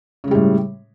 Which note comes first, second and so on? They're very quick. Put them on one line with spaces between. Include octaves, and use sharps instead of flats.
C#3 G#3 G3 A2